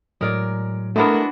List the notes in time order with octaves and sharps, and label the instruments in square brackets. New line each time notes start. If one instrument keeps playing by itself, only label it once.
[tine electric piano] A2 F#3 [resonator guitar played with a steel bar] G#3 A#4 D5
[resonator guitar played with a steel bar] G#3 B3 E4 [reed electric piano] A3 A#4 [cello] D4 F#4